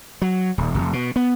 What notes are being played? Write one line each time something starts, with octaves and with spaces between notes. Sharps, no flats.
F#3
D#1
F1
B2
B3